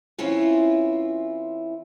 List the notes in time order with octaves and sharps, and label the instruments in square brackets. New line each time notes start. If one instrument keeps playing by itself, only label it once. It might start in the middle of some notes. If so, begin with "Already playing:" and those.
[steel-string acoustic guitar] E3 C4 C#4 E4 F4